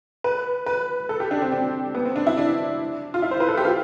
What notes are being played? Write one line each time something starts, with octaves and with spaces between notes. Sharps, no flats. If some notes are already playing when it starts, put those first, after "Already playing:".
B4
B4
A4
G4
D4
C4
C4
B3
C4
D4
E4
D4
F4
E4
C5
B4
A4
G4
F4